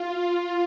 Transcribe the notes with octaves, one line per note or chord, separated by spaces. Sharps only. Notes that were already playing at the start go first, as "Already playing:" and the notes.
Already playing: F4